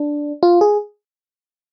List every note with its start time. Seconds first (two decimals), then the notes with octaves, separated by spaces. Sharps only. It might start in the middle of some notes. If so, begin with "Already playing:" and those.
Already playing: D4
0.43 F4
0.61 G#4